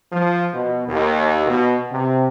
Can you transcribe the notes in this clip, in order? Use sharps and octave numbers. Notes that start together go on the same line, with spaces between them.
F3
B2
D#2
B2
C3